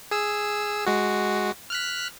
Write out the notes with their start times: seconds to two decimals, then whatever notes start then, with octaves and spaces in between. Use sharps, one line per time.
0.11 G#4 E6
0.87 G#3 F#4
1.70 F6 F#6 B6